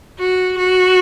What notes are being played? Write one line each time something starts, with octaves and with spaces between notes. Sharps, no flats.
F#4
F#4